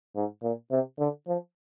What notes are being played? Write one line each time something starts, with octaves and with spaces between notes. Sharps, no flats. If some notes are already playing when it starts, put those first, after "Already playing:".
G#2
A#2
C3
D3
F3